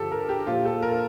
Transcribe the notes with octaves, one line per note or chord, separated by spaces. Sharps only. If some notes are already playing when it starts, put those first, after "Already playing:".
Already playing: G2 D3 F3 G4 A4
A#4
G4
A#2 F3 F4
A4
A#4